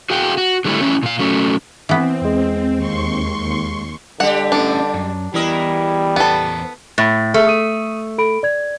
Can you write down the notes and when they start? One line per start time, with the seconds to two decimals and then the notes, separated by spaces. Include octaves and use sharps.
0.10 F#4 G#4 F5 G5
0.37 F#4
0.65 D3 G3 A3 E4
0.81 E3 G3 C#4 E4
1.03 A#2 F5
1.19 F#3 A3 C#4
1.89 E3 B3 C4
2.21 E2 G#3
2.75 D#2 C6 C#6
4.20 D3 G3 G4 F#5
4.52 C#4 D4 A4 B4
4.93 F#2
5.34 E3 G3 B3 E4 A#4 D#5
6.16 E2 B3 A4 B4 C5
6.98 A2 A6
7.34 A3 G#4 E5 F6
7.47 D#6 D#7
8.18 A4 B5 D7
8.43 D5 G#6